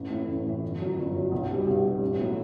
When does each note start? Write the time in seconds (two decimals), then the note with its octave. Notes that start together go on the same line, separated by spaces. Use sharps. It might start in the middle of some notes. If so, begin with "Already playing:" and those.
Already playing: A1
0.10 A2 E3
0.28 A1
0.45 A2 E3
0.63 G1
0.80 F#2 F#3
0.97 G1
1.15 F#2 F#3
1.32 B1
1.49 B2 G3 B3
1.67 B1
1.84 B2 G3 B3
2.01 A1
2.19 A2 F#3 B3